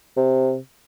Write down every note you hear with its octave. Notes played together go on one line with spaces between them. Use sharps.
C3